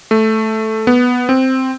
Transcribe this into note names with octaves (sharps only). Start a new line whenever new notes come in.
A3
B3
C4